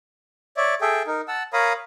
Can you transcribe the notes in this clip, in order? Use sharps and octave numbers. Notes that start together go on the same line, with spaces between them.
C#5 D5 E5
G#4 A4 E5 G5
D#4 A#4
F#5 A5 E6
A#4 C#5 F5 A#5 B5 D#6